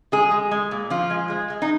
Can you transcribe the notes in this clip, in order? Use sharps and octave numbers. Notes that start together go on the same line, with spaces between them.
G#3 G#4
G#3
G#3
A#2
F3 F4
G#3
G#3
G#3
D#4